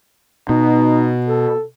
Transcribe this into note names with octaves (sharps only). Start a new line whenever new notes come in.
B2 D#4
A4